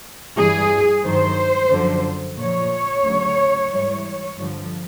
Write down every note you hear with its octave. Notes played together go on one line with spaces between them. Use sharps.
G2 E3 G3 G#4
G2 D#3 F#3 C5
F#2 D3 F3
A#2 F3 C#5
D2 C#3 F#3
G#2 E3 G3
G2 D3 F3